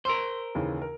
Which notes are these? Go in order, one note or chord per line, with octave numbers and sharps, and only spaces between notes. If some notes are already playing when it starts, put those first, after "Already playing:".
A#4 C5 C6 E6
D#2 C#3 E3
A#4